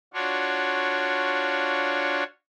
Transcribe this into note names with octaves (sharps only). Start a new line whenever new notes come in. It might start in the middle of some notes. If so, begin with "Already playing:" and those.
D4 F4 F#4 C#5